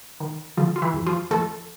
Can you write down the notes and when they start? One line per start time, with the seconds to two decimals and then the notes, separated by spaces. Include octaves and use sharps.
0.20 D#3
0.57 D3 F3 F4
0.76 F4
0.82 E3 E4
0.94 F2
1.06 F3 F4
1.31 F2 A3 A4